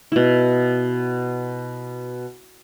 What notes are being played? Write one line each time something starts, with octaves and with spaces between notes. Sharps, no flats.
B2 E4